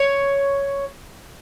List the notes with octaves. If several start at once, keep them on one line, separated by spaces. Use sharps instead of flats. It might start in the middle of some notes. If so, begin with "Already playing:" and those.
Already playing: C#5